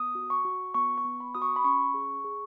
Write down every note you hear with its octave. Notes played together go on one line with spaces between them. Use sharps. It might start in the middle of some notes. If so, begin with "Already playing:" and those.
Already playing: B3 D#6
F#4
C#6
F#4
B3 C#6
C#6
B3
B5
F#4 D#6
C#6
B5
C#4 C#6
G#4
G#4